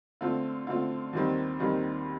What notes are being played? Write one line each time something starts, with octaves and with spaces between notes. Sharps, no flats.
D3 A3 C4 F4
D3 A3 C4 F4
D#2 D#3 G3 C4
D#2 D#3 G3 C4